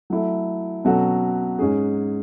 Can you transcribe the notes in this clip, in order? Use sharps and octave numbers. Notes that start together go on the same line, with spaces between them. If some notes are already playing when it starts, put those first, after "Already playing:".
F#3 A3 E4 A4
B2 F#3 C#4 F#4 A4
G#2 G#3 C#4 G#4